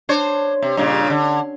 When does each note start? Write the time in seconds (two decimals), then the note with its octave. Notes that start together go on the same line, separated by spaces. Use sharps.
0.09 D4 C5 C#5
0.62 C3
0.77 G2 A#2 C#3
1.10 D3